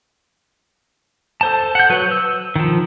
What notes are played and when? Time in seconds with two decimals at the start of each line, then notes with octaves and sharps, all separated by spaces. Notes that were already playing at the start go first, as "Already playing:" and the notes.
1.41 A4 C5 A5
1.75 F#5 G6
1.90 F#3 B4
2.11 E6
2.56 D#3 F3